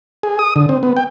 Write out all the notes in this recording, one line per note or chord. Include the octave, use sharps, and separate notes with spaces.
G#4
D#6
D3
C4
B3
G5